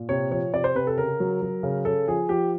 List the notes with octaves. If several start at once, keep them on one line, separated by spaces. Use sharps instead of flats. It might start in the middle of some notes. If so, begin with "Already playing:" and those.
Already playing: A#2
C3 C#5
F3 C#5
C3 D5
C5
C3 B4
A4
C#3 A#4
F#3
F#3
C#3
C#3 A4
F3 G#4
F3 G4